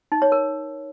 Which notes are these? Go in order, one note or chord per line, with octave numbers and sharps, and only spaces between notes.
D#4
C#5
A#4